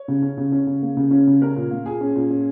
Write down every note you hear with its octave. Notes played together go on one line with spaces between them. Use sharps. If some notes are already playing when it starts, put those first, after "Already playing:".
Already playing: C#5
C#3
C#4
C#3
C#4
C#3
A#3
C#3
C#4
C#3
C#4 A#4
A#2
A#3
A#2 G#4
C#4
A#2
C#4